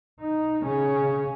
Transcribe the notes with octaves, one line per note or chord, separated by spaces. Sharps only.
D#4
C#3 C#4